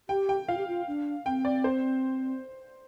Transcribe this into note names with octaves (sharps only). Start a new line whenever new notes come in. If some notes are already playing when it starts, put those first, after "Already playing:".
G4 G5
G5
F4 F5
G4
F4
D4
C4 G5
D5
C5